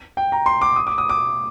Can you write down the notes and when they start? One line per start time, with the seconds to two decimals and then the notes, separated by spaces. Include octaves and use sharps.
0.17 G5
0.32 A#5
0.46 C6
0.61 D6
0.76 D#6
0.87 D6
0.98 D#6
1.09 D6